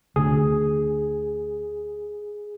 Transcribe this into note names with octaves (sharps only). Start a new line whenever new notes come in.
D2 D3 G#4